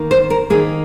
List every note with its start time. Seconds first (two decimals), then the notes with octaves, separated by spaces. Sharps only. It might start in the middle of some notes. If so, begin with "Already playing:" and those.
Already playing: D#3 A#3
0.11 C5
0.30 A#4
0.50 D#3 A#3 G#4